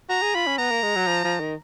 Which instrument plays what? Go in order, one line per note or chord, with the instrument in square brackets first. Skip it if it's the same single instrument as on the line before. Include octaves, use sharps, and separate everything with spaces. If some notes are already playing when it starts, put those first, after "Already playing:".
[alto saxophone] F#4 [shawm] A#5
[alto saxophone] G#4
[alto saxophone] F4 [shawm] B5
[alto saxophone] C#4
[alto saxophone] B3 [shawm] A#5
[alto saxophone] A#3
G#3
F#3
F3
F3
D#3